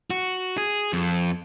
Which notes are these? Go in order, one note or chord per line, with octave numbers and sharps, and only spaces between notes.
F#4
G#4
F2